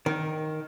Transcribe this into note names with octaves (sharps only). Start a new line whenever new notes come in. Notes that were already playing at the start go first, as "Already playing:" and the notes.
D#3